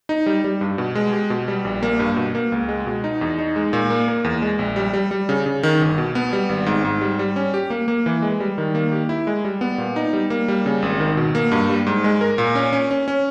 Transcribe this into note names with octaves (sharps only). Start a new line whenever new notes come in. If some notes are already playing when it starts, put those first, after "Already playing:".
D#4
G3
G3
G2
B2
G#3
G4
B2
G3
A#1
A#3
G2
B2
A#3
C#2
G#3
B2
D#4
E2
D#4
G#3
A#2
A#3
A#3
E2
G#3
A#1
G3
G3
G3
C#3
C#3
D#3
G1
B2
B3
G3
G#1
G#2
G#2
G3
G3
C#4
G4
A#3
A#3
E3
G#3
G3
D#3
A#3
G4
E4
G#3
G3
B3
A#2
D#4
G3
A#3
G3
C#3
G#1
D#3
B2
A#3
G2
G3
G#2
G#3
A#4
A#2
C#4
C#4
C#4
C#4